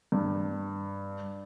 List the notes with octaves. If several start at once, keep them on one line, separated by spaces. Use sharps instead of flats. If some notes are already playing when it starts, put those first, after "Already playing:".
G2